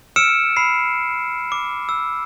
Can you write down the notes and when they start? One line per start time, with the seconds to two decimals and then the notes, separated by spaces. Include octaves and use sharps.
0.16 E6 F6 C#7 D7 E7
0.57 B5 C7
1.52 D6
1.89 E6